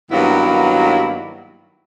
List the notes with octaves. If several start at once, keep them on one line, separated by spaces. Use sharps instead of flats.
G2 D#3 F#3 A#3 B3 E4